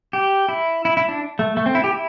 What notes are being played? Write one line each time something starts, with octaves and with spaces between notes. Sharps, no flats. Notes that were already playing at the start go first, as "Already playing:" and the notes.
G4
E4
E4
E4
D4
A3
A3
C4
E4
G4
E4